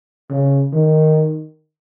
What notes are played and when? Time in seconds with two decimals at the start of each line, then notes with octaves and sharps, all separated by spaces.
0.30 C#3
0.73 D#3